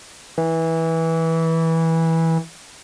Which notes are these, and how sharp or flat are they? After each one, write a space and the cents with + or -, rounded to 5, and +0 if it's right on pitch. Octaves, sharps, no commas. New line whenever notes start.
E3 -15